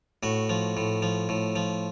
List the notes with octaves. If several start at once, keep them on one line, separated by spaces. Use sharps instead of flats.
A2 F#4
F3
A2
F3
A2
F3